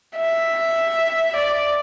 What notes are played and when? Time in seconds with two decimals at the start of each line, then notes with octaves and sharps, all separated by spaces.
0.17 E5
1.36 D5